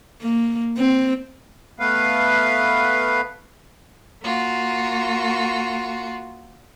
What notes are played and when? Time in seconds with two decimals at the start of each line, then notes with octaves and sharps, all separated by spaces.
0.22 A#3
0.78 C4
1.80 A3 B3 B4 F5
4.23 A#3 F4 F#4